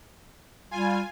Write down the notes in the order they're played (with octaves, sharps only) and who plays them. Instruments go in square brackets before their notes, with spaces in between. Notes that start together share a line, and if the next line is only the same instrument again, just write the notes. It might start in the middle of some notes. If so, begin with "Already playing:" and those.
[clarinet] G3 [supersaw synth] F4 G#5